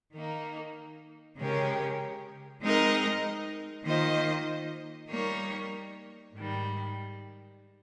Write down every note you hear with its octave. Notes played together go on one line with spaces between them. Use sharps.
D#3 A#3 D#4
C#3 G#3 C#4 G4 A#4
G#3 C4 D#4 A#4 D#5
D#3 A#3 F4 C5 D#5
G3 A#3 D#4 A#4 C#5
G#2 D#3 G3